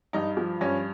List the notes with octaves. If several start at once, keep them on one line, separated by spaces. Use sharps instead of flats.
G2 D#4
F3
G2 C#4